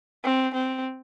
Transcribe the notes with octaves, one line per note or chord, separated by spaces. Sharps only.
C4
C4